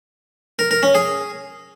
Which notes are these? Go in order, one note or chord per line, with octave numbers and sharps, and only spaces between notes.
A#4
A#4
C#4
G#4